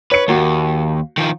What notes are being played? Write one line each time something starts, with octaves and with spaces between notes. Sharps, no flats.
B4 C#5 C#7
D#2 A#3 F#4
D#3 F3